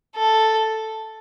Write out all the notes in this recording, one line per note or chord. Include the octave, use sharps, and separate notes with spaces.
A4